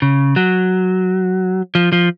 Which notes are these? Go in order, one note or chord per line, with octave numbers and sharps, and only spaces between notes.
C#3
F#3
F3
F3